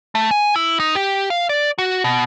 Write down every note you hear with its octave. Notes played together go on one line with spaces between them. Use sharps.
A3
G#5
E4
D#4
G4
F5
D5
F#4
B2